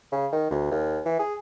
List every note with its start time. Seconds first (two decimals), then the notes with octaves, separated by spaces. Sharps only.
0.12 C#3
0.32 D#3
0.51 D2
0.71 D#2
1.06 E3
1.19 G#4